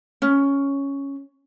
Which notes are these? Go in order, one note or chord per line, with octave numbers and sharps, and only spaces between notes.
C#4